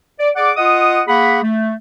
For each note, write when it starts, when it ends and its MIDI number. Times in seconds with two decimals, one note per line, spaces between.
0.19 0.29 74
0.36 0.52 68
0.36 0.52 74
0.36 0.52 78
0.36 0.52 86
0.57 1.02 65
0.57 1.02 75
0.57 1.02 78
0.57 1.02 87
1.07 1.39 58
1.07 1.39 68
1.07 1.39 78
1.07 1.39 83
1.43 1.74 57